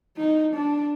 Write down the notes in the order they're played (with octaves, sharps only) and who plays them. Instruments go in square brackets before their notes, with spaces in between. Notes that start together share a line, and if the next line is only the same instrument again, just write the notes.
[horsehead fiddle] D#4
D4